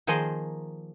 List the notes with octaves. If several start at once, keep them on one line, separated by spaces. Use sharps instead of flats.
D#3 F3 A#3 G#4 C5 D#5